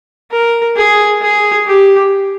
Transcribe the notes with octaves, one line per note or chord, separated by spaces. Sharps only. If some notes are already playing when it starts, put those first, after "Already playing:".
A#4
G#4
G#4
G4